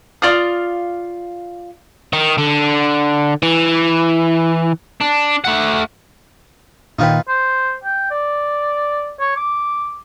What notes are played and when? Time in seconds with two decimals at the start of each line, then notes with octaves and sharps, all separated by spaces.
0.22 F4 D5 F5 D#6
2.13 D#3
2.38 D3
3.43 E3
5.01 D4
5.45 A3 F#5
6.99 A#2 D#3 D#4 F4 B4 G5
7.28 C5
7.84 G5
8.11 D5
9.20 C#5
9.36 D6